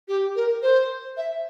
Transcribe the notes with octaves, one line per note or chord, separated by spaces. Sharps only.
G4
A#4
C5
E5